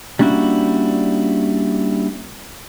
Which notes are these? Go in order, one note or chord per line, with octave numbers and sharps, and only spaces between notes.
G3 A#3 C#4 D4 E4 F#4